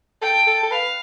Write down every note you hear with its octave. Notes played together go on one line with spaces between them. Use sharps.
A4 G5
A4
A4
B4 F5